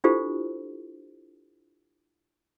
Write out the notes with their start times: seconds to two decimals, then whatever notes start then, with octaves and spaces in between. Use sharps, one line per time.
0.04 D4 E4 F4 G4 A4 C5